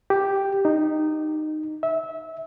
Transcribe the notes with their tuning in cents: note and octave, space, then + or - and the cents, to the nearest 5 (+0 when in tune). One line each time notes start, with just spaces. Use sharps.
G4 +0
D#4 -15
E5 -25